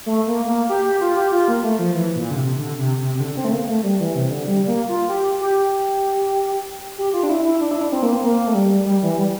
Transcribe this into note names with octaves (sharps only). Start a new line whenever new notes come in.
A3
A#3
A#3
G4
G4
F4
G4
F4
A#3
A3
F3
E3
A#2
D3
C3
D3
C3
C3
C3
D3
C4
A3
A#3
A3
G3
E3
C3
D3
G3
A#3
F4
G4
G4
G4
F4
D4
E4
E4
D4
E4
D4
C4
A#3
C4
A#3
A3
G3
G3
E3
G3